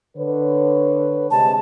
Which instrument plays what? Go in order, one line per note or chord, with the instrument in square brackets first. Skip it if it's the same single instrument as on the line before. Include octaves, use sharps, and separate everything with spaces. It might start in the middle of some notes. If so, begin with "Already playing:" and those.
[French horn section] D3 B4 C#5
[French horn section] C3 G#3 [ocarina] A5